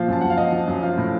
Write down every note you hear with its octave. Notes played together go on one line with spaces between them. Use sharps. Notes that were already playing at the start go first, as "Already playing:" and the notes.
Already playing: A#2 F3 F5
F#2 A5
F#2 F#5
F5
F3 D#5
F3
F#2
F3 F5
A2